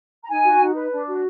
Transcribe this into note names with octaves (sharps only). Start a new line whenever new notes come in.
A#5
D#4 G#5
F#4
D#4
B4
D4
F#4